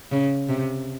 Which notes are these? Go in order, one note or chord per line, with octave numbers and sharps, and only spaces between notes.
C#3
C3